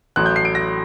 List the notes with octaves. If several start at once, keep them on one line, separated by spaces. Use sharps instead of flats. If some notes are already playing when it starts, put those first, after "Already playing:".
A1 A2 F#3 F#6
G6
C7
D7
A#6